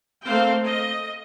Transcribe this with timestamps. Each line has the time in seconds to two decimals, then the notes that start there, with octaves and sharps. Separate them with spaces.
0.24 A3 A#3 C4 C5 F5 G5
0.64 D#5